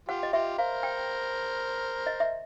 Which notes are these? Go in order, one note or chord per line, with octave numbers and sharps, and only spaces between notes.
F4 G4 F#5
D#5
F4 G4 E5
A#4 C5 F5
G5
D#5
E5